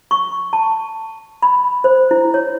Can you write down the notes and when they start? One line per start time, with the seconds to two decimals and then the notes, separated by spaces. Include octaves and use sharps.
0.11 C#6
0.53 A5
1.42 B5
1.84 C5
2.11 E4
2.34 C#5